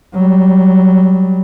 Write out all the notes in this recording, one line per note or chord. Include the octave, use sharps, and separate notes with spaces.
F#3 G3